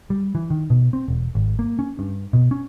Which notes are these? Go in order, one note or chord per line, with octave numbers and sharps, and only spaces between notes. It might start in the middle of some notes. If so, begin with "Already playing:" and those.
G3
E3
D#3
B2
C4
E1
G#1
A#3
C#4
G2
B2
C#4